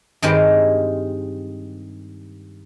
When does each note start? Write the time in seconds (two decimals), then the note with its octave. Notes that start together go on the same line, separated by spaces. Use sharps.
0.22 G2 D#3 G#3 C4 G4